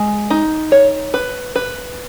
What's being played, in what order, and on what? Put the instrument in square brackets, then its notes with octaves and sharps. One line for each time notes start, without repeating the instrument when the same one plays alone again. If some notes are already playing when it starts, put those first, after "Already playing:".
Already playing: [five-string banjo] G#3
D#4
C#5
B4
B4